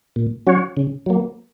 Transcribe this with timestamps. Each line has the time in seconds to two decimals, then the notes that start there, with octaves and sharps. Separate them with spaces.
0.16 A#2
0.47 F#3 C#4 F#4 C#5
0.77 C#3
1.06 F#3 A#3